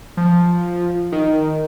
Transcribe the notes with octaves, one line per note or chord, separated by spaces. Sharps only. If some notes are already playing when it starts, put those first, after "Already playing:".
F3
D#3